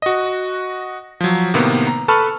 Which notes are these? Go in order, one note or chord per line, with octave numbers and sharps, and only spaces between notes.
F#4 D#5
F3 F#3
A2 C3 D#3 A#3 B3
A#5
A4 B4 A5 B5 C#6 F6